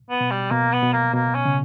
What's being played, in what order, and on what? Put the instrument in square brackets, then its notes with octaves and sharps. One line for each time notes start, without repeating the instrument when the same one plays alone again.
[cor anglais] B3
[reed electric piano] B2
[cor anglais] G3
[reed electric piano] B2 [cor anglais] A#3
[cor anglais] B3
[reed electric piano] B2
[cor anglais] A#3
[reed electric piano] B2 [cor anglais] A#3
[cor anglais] C#4
[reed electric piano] C#3